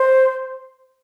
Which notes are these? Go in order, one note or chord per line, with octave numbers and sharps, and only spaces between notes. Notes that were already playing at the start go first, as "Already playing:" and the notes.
Already playing: C5